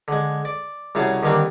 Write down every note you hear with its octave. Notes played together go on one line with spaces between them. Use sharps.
D3 G#3
D5
C2 C#3 F#3 G#4 A5
D3 D#3 G3 A#3 C4 D4